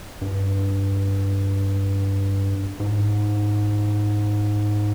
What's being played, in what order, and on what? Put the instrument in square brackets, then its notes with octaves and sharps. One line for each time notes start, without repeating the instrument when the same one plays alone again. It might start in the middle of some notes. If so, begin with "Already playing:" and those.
[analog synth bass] G2
G#2